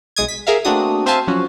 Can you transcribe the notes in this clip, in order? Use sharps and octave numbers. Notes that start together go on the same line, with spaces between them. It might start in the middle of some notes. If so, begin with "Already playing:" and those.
B1 G#3 D#6 G#6
B6
G#4 A#4 E5 F5
A3 A#3 C4 D4 F#4 D#6
C4 C5 E5 F5 G#5 A5
F3 F#3 C#4 F#4